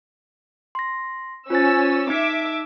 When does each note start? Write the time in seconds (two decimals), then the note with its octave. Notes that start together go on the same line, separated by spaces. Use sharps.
0.75 C6 A#6
1.50 C#4 F4 C5 E6 A6
2.10 D#4 E5 D6